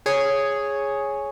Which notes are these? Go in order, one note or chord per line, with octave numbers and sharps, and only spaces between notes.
G#4 C#5